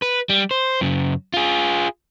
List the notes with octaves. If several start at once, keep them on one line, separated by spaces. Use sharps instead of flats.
B4
G3
C5
F#2 C#3
F4 G#4